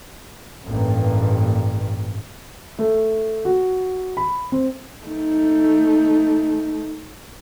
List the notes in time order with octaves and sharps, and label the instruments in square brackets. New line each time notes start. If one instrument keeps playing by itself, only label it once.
[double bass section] A1 G2 A#3
[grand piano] A3
F#4
B5
C4
[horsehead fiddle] A3 D#4